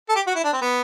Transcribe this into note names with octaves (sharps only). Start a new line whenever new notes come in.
A4
G4
F#4
E4
D4
C4
B3